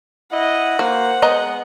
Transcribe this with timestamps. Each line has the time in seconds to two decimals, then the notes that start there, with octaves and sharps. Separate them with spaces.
0.32 E4 D#5 F#5
0.79 A#3 F#4 C5
1.22 G#3 B3 D#5 A#5